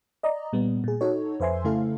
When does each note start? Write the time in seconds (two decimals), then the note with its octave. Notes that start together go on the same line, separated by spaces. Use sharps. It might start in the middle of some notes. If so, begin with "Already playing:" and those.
0.23 D5 D#5 A#5
0.53 A#2 G3 B3
0.84 A#2 G#4
1.01 D#4 F#4 A4 C#5
1.40 F2 B4 C5 E5 G#5 C6
1.64 C#3 A3 E4 A4 F5